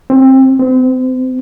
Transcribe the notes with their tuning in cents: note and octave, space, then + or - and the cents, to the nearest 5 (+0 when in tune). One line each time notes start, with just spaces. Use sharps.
C4 +20
C4 -35